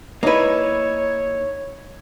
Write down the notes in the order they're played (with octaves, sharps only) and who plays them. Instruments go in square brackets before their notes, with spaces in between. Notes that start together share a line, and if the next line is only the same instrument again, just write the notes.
[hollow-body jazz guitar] A#3 B4 [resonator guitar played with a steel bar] D#4 E4 [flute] C#5